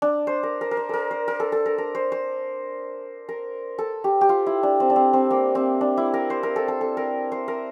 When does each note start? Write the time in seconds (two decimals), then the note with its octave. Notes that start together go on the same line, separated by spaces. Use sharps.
0.02 D4
0.27 C5
0.43 A#4
0.61 A#4
0.71 A#4
0.77 C5
0.89 A4 A#4
1.11 C5
1.28 A#4
1.40 A4
1.52 A4
1.66 A#4
1.78 A#4
1.95 C5
2.12 C5
3.29 A#4
3.79 A4
4.04 G4
4.21 G4
4.29 F4
4.46 E4
4.63 D4
4.80 C4
4.90 D4
4.96 C4
5.13 C4
5.31 A#3
5.55 C4
5.81 D4
5.97 E4
6.14 A#4
6.30 C5
6.43 A#4
6.56 A4
6.68 A4
6.81 A4
6.97 A#4
7.32 C5
7.48 A#4